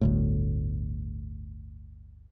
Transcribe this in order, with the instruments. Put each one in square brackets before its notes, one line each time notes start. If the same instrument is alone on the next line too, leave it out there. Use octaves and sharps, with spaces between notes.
[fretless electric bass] G1 D2 A2